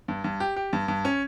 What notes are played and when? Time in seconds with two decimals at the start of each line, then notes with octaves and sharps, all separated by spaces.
0.08 G2
0.24 G2
0.40 G4
0.56 G4
0.73 G2
0.88 G2
1.05 C#4